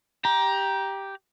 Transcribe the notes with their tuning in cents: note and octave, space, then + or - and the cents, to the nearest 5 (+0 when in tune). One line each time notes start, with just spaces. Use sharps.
G4 +0 A#5 +20